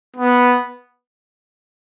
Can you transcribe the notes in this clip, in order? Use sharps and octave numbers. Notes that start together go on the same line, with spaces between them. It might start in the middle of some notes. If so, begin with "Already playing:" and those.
B3